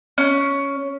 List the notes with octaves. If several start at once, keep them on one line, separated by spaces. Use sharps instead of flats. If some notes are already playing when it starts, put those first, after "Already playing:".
C#4